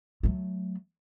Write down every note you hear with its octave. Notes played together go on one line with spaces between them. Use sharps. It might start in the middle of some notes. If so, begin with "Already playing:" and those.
F#3 A3